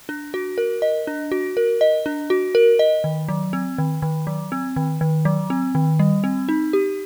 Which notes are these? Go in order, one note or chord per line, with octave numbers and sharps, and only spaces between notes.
D4
F#4
A#4
D#5
D4
F#4
A#4
D#5
D4
F#4
A#4
D#5
D#3
F#3
C4
D#3
D#3
F#3
C4
D#3
D#3
F#3
C4
D#3
G3
C4
D#4
G4